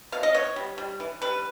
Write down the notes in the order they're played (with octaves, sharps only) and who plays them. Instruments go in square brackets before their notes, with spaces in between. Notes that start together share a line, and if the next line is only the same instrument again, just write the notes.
[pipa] B2 F5
D#5
B3 C#5
G3
G3
E3
G3 B4